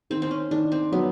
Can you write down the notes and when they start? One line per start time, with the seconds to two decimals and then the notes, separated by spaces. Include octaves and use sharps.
0.10 D#3 C4
0.22 C4
0.31 C#4
0.51 D#3 D4
0.72 C4
0.92 F#3 B3